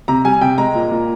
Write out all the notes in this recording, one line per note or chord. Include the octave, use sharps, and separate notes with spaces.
C3 A#5
G3 G#5
C3 G5
G#3 A#5
A#2
A#2